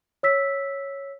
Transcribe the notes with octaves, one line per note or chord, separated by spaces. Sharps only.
C#5 E6 B6